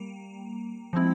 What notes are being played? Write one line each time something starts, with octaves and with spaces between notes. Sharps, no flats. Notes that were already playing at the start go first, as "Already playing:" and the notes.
Already playing: G3 A#3
F3 G#3 C4 E4